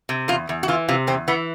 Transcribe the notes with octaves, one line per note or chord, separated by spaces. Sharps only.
C3
E2 F4
E2
F#4
E3 F4
C3 F4
E2 C4
E3 B3